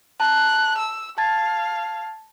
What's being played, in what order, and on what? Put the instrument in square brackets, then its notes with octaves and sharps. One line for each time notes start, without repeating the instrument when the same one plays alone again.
[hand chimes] A5 A#5 [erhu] F#6
[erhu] E6
[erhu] F5 [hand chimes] A5 G#6 A6